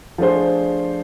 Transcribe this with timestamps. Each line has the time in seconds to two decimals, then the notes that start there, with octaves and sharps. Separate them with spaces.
0.18 F3 A3 D4 G#4 C5